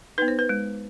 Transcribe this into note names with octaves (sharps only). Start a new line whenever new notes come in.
B3 D#4 B4
C5
B4
G#3